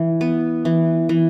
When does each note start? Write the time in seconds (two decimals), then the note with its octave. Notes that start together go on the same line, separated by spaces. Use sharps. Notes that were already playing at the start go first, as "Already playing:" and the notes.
Already playing: E3
0.21 B3
0.65 E3
1.09 E3